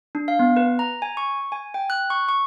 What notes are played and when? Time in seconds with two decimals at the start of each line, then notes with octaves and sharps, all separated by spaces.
0.15 D4
0.28 F5
0.39 B3
0.57 B4
0.79 A#5
1.02 G#5
1.17 C#6
1.52 G#5
1.74 G5
1.90 F#6
2.10 C#6
2.29 C#6